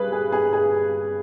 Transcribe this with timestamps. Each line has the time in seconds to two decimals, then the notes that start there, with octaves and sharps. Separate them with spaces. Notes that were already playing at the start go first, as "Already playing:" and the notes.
Already playing: G2 G#4 B4
0.12 G#4
0.32 G#4
0.53 G#4